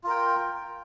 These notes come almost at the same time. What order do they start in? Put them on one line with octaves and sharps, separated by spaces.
F4 A#4 G5